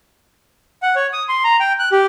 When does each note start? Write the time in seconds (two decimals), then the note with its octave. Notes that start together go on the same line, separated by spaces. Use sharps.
0.82 F#5
0.96 C#5
1.13 D#6
1.29 C6
1.44 A#5
1.60 G5
1.79 F#6
1.92 G4